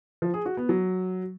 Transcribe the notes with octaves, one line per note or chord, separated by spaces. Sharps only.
F3
G#4
F#4
B3
F#3